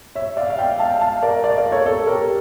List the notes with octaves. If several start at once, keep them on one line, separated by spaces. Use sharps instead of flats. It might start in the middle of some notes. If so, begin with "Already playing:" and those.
C#5 E5
D5 F5
F5
E5 G5
F5 A5
F5 A5
A#4 D5
D5 F5
A#4 D5
A4 C#5
A4
G4 A#4